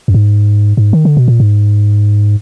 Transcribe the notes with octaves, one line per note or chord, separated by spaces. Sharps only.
F#2
G#2
G#2
D#3
D3
B2
A#2
G#2